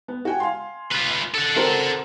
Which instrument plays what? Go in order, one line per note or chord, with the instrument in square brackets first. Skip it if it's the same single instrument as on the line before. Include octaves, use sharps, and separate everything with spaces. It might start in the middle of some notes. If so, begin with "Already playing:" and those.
[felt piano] B3
F#4 G5 G#5
F5 G#5 C6
[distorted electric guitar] F4 B4
A4 F#5
[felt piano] C4 F#4 A#4